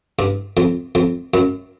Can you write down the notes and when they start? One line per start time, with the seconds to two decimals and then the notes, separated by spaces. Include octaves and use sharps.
0.19 G2
0.57 F2
0.95 F2
1.34 F#2